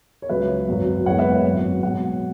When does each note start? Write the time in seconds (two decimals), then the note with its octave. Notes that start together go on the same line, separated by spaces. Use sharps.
0.22 C#5
0.29 C#2 C#3 F#3 B4 E5
0.68 G#1 F#2 F#3
1.06 F#1 E2 E3 G#3 C#5 F#5
1.19 B4 E5
1.32 C#5 F#5
1.44 G#1 F#2 F#3
1.83 B1 B2 G#3 C#5 F#5